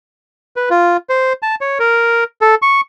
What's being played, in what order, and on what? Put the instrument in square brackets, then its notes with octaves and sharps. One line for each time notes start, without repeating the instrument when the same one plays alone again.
[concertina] B4
F4
C5
A5
C#5
A#4
A4
C#6